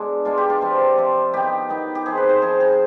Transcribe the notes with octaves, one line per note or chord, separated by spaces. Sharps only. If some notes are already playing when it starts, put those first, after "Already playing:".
Already playing: B2 G#3 D4
B2 G#3 D4 F4
G4
F4
C3 F3 C4
C3 F3 C4
D#3 B3 D#4 G4
D#3 B3 D#4
G4
F3 C4 D#4 G#4
B4
C5
F3 C4 D#4 G#4
G#4